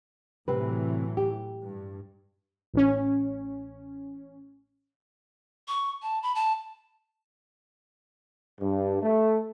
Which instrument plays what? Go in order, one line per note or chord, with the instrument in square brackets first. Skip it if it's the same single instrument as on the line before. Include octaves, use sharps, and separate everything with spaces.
[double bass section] A2 E3 F#3 [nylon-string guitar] C3 C4 B4
[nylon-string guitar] G4
[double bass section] G2
[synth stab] A1 C#4
[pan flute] C#6
A5
B5
A5
[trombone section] G2
A3